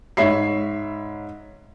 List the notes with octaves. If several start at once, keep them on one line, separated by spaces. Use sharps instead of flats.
G#2 C#5 E5 B5 C7